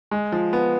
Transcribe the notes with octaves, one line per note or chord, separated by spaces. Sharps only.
G#3
F3
B3